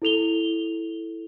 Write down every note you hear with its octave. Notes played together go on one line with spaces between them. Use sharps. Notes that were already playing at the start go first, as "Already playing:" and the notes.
E4 A4 F7 G7